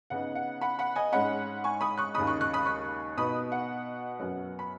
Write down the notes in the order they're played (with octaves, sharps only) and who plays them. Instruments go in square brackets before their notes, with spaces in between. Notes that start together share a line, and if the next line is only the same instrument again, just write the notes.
[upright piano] C#3 B3 D#4 F#5
F#5
F#5 B5
F#5 B5
D#5 G#5
G#2 G#3 C#4 F#5 B5
G#5 C#6
B5 D#6
C#6 F#6
D#2 C#3 G#3 D#4 B5 D#6
C#6 F#6
C#6 F#6
B5 D#6
C#6 F#6
B2 B3 D#4 B5 D#6
F#5
F#2 F#3 B3
B5